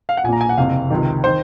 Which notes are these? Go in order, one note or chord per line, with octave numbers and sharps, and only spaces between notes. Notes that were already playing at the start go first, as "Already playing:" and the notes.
F5
F#5
A#1 A#2 G#5 A#5
G#5
F#5
F#1 F2 C3 F5
C#2 C3 D#3
D#3 C5